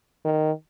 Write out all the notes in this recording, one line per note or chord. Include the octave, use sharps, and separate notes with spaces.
D#3